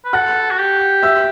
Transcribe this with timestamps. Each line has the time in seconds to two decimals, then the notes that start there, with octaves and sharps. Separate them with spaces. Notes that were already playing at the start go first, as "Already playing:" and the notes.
0.05 B4
0.13 A4 F#5 F#6
0.50 F#4
0.58 G4
1.02 E5 E6